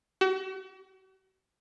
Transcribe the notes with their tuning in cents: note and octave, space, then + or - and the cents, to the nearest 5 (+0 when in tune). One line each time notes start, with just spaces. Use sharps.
F#4 +40